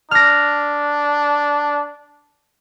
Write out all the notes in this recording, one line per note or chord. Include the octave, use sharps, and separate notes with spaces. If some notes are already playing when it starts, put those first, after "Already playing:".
D4 F6 A#6